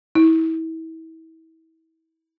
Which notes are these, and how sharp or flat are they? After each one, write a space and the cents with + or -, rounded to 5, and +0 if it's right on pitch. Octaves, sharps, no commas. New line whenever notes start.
E4 -30